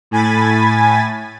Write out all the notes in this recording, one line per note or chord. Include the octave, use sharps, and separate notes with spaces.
A2 G#5 B5 A6